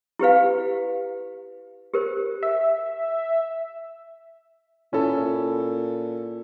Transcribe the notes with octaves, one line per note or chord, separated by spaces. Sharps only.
E4 G4 B4 F5
G4 A#4 C5
E5
A#2 C#4 E4 A4